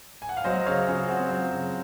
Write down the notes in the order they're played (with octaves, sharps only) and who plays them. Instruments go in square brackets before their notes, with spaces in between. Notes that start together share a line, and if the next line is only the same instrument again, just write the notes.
[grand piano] G#5
F#5
F5
F#3 C5 D#5
C#3 C#5 F5
C#3 F4 G#4
C4 F#4
F#3
C#3